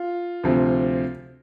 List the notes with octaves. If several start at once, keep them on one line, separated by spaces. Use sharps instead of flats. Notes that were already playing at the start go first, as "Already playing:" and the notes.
Already playing: F4
D2 C3 F3